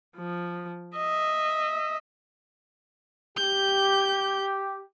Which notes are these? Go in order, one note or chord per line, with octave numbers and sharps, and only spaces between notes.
F3
D#5 E5
G4 G6